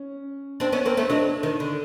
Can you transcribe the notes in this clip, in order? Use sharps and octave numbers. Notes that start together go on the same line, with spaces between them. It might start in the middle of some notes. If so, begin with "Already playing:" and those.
Already playing: C#4
C4 D4
B3 C#4
A#3 C4
A3 B3
F#3 G#3 D4
D#3
D3